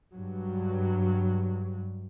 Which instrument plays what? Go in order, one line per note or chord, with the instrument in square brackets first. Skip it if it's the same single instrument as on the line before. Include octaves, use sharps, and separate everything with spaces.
[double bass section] G2 F#3